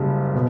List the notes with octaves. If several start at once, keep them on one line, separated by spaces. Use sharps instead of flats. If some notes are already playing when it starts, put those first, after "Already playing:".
Already playing: F#1 F#2 C#3 G3
B2